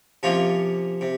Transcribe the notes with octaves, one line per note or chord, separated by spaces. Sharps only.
C3 F3 A#3 C#4 F4
C3